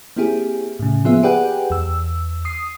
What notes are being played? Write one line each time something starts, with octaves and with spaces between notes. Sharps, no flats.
A#3 C4 E4 G4 G#4
A2 C#3
F3 A#3 B3 F4 G#4 E5
G4 G#4 B4 D5 F#5 G5
E2 E6
D#6 C7